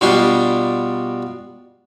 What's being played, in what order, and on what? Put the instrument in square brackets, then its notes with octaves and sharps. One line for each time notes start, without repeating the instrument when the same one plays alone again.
[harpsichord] B2 G3 D4 F4